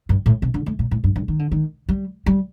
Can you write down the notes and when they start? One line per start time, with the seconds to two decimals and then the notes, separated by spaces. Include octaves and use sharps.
0.09 G2
0.26 A2
0.42 C3
0.54 D3
0.66 A3
0.79 A#2
0.91 A2
1.04 G2
1.16 G2
1.28 D#3
1.39 D3
1.51 D#3
1.89 G3
2.26 G3